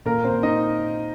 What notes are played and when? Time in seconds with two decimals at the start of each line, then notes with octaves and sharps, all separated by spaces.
0.05 A#2 A#3 A#4
0.24 C4 C5
0.31 A#2
0.43 D#4 D#5